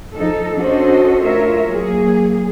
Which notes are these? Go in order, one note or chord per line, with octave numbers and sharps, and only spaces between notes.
F3 D#4 A4
C#4 D4 F#4 A4 C5 D#5
A3 F4 A#4 C#5 E5
F#3 A#3 G#4